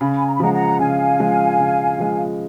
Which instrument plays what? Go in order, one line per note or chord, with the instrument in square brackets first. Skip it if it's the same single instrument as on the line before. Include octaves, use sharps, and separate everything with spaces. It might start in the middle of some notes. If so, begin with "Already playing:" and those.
[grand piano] C#3 [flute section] B5
[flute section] G#5 B5
A#5
B5
[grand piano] F3 G#3 [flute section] F#5 A#5
[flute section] F#5 A#5
[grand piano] C#3 [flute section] F5 G#5
[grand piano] F3 G#3
C#3
F3 G#3